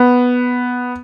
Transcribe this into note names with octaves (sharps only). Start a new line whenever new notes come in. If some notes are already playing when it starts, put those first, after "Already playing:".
Already playing: B3